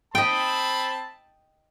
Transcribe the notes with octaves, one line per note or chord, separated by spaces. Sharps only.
C4 D#5 G5 A5 B5